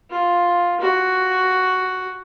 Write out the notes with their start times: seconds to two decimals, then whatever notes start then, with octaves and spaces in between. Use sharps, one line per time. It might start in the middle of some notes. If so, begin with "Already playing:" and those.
0.10 F4
0.80 F#4